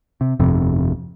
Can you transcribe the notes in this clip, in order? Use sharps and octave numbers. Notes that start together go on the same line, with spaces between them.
C3
G1 F2 C3